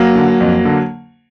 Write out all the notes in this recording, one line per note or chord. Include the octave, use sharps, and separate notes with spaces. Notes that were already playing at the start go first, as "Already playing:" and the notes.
Already playing: F#3 A#3
D3
F2
D3